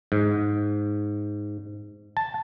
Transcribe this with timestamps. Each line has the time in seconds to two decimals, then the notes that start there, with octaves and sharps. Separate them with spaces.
0.12 G#2
2.17 A5